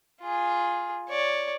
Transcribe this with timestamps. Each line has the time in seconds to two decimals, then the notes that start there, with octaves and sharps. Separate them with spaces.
0.22 F4 G#4
1.09 C#5 D5